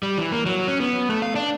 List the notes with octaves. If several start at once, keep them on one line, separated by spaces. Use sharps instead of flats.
G3
E3
A#3
F#3
C#4
B3
A3
F5
D4